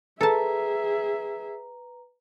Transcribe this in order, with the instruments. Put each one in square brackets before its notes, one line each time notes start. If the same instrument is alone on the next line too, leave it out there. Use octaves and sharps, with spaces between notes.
[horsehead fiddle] G#4 E5 [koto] A4 A5 [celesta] B4 A#5